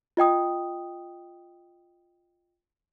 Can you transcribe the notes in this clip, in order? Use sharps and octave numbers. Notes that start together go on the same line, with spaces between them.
F4 D#5 G5 D#6